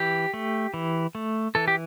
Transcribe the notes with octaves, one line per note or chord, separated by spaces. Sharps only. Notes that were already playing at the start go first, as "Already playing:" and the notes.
Already playing: E3 G4
A3
E3
A3
E3 A4
G4